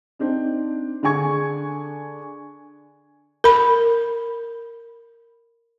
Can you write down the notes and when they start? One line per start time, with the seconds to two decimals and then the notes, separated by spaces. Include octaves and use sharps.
0.19 C4 D4 D#4
1.03 D3 D4 G#4 G#5 C#6 G#6
3.44 A#4 B5